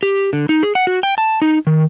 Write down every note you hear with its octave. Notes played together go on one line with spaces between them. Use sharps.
G4
D3
D#4
G#4
F#5
F#4
G5
A5
D#4
D#3